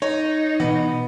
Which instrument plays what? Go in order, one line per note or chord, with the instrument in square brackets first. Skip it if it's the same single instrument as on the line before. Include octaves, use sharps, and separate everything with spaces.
[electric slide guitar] D#4 [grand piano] C#5
[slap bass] B2 E3 [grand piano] B3